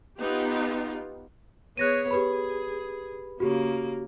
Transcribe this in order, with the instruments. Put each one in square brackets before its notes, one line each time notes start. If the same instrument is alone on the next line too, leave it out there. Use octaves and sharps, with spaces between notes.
[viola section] B3 D#4 F4 G4
[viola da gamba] B3 G#4 C#5 [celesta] F#6 A#6 D#7
[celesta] G4 B4 B5 [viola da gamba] G#4
[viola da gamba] C#3 A#3 [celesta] F#4 G4